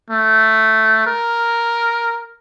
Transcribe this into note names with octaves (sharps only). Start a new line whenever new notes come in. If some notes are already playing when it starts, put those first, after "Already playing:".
A3
A#4